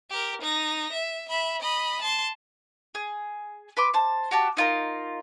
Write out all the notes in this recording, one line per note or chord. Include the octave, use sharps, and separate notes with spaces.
G4 A#4
D#4 A#6
E5
E5 B5
D#5 B5
A5 C6
G#4
B4 C6 D6
C5 A5
F#4 G4 A5
D#4 F4 A#4